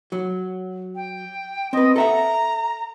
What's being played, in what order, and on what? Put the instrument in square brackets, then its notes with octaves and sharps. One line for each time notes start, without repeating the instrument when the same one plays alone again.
[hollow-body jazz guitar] F#3
[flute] G5
[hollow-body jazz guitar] C4 B4 [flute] D#5
[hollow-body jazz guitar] A4 E5 F#5 [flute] A#5